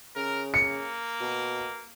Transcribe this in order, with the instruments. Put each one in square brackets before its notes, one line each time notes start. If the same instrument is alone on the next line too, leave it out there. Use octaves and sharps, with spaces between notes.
[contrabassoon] C#3 [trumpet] A#4
[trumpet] A#3 [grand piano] C#7
[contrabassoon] B2